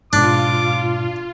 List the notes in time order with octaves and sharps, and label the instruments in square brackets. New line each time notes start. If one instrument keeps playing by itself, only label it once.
[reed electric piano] G#2 B2 [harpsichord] D4 [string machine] F4 [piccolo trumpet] D6